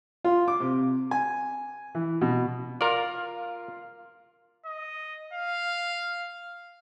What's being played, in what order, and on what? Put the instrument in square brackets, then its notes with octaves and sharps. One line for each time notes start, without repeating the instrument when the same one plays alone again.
[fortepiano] F4
D6
C3
G#5
E3
B2
[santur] F4 [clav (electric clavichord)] A#4 D5
[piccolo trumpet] D#5
F5